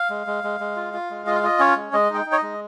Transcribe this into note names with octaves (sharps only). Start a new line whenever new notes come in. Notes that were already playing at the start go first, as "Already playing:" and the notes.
Already playing: F5
G#3
G#3
G#3
G#3
F4
F4
G#3
F4 D#5
F5
F4 D#5
C#4 C#5
G#3
G#3 D#5
D#4 G5
D#4
C#5
D#5
G#3